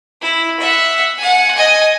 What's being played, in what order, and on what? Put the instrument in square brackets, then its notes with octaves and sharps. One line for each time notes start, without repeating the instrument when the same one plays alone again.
[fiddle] E4
E5 F#5
F#5 G#5
D#5 G#5